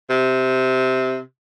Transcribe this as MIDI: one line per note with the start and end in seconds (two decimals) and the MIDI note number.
0.10 1.20 48